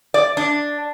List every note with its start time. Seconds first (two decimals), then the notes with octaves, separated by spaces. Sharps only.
0.14 D5
0.37 D4